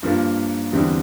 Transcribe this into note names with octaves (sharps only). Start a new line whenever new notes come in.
G2 F3 A#3
E2 D3 G3 C4 E4